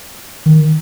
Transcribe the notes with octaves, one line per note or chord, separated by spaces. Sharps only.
D#3